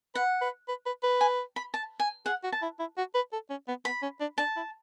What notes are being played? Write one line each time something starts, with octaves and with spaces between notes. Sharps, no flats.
B4 F#5
B4
B4
B4
B4
G#5
B5
A5
G#5
G#4 F#5
F#4
A5
E4
E4
F#4
B4
A4
C#4
B3
B3 B5
C#4
D4
D4 A5
E4